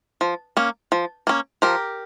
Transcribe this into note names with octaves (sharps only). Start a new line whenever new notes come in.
F3
A#3 C#4
F3
A#3 C#4
F3 G4 A#4